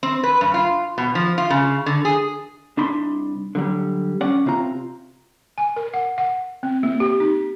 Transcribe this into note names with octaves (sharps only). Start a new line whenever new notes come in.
C4
B4
G2
F4
B2
F3
F4
C#3
D3
G#4
C2 D4 D#4 B5 C6
D3 F#3 G3
C#4 D5 F#5
C3 C4 F4 A#5
G#5
A#4
F#5
F#5
C4
A#3
G4
D#4